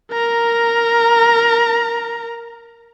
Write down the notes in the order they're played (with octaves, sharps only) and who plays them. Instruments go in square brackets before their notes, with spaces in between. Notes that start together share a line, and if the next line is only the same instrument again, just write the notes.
[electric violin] A#4 A#5